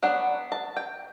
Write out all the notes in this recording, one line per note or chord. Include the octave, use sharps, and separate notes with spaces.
F#3 B3 D4 F#5
A5
G5